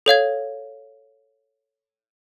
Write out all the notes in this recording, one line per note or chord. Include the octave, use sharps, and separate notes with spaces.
A4 C#5 F5 G#6